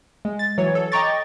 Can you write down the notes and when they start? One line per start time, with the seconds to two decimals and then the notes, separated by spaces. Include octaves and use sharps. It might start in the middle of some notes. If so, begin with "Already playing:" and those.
0.25 G#3
0.39 A6
0.58 E3 F#3 C#5
0.75 A4
0.92 D#5 G5 A#5 C#6 D6 A6